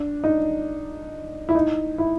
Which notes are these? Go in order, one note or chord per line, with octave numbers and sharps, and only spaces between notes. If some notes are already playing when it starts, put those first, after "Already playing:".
Already playing: D4
D#4
E4
D#4
E4